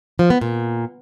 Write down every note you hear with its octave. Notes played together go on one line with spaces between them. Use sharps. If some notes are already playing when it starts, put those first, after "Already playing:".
F3
B3
A#2